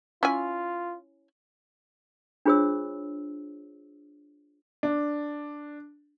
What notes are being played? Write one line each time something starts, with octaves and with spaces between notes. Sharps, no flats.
C#4 E4 F4 G#5
D4 F4 G#4 C5 C#5 E6
D4